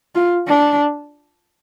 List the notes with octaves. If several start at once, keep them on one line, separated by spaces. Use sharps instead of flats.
F4
D4